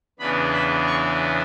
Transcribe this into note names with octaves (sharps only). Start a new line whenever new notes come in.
E2 C#3 E3 B3 D4 B5
B5
C#6